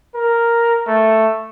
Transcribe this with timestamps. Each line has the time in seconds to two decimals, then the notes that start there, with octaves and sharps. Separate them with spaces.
0.15 A#4
0.87 A3